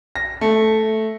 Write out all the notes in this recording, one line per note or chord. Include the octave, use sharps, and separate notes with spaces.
A#6
A3